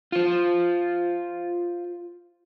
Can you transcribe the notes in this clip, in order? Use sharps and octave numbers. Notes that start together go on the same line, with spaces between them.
F4 C5